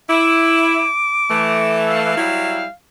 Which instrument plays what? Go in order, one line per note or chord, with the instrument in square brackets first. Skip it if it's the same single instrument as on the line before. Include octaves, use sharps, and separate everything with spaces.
[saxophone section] E4 [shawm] D6
[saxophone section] E3 A3
[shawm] F5
[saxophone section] F#3 G3 E4